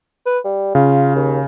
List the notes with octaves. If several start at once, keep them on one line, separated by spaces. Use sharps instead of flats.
B4
G3
C#3 F4
D#2